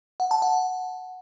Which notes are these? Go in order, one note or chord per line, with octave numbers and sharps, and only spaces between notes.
F#5
A5
F#5